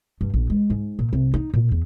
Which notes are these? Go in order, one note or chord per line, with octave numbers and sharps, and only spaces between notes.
G2
A#1
G#3
G#2
A#2
C2
D#4
A#2
E2